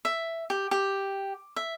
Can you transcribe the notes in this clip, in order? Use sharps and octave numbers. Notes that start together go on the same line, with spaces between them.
E5
G4
G4
E5